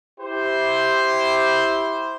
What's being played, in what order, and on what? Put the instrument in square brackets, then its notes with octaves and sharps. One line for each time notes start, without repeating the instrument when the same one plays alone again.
[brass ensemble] E4 G4 C5